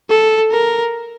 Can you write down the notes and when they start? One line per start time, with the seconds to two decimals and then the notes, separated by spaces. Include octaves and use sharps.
0.10 A4
0.51 A#4